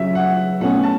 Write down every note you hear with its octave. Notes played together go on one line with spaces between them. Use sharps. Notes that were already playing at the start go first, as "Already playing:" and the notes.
Already playing: C#3 F#3 C#4 E5
F#5
B2 A3 C#4 F#5
A5